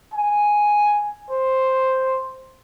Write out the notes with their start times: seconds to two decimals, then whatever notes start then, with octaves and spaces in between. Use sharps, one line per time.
0.13 G#5
1.31 C5